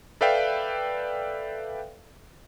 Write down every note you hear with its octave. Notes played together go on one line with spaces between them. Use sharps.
A4 B4 D5 E5 F5 G5